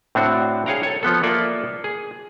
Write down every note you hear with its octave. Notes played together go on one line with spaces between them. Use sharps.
A2 C4 D4 F#4
G#4 C#5 F5 G5 A#5
A4 C#5
F3 B3 A4
A#3 F4 A4 D5 E5
G#4